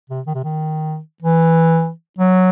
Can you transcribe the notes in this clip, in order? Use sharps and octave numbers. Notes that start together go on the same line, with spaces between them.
C3
D#3
C3
D#3
E3
F#3